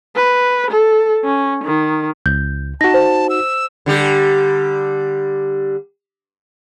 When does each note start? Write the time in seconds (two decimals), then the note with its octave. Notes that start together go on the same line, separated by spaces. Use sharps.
0.16 B4
0.71 A4
1.24 C#4
1.64 D#3
2.26 C#2 G6
2.81 D#4 F#4 A5 A#6
2.94 C5
3.30 E6
3.86 D3 G3 G4